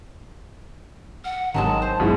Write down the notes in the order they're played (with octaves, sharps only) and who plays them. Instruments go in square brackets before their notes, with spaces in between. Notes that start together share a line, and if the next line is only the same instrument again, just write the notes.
[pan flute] F#5 [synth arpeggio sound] F6
[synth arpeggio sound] G#1 C3 A#6 [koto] D#3 F#3 G#3 [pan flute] A5
[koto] C5
[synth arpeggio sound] G#1 F#2 E4 [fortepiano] B2 G#3